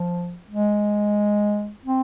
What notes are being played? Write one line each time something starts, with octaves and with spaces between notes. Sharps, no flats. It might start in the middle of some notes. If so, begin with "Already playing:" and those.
Already playing: F3
G#3
C4